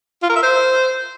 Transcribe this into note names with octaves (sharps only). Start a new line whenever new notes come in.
F4
A#4
E5
C5